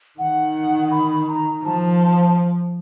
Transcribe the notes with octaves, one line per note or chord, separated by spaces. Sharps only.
D#3 F#5
B5
A#5
F3 A5